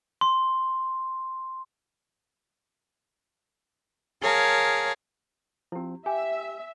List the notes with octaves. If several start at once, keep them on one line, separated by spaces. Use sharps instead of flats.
C6
G#4 A#4 C#5 F5 A5
F3 C4 E4 G4
G4 E5 G#5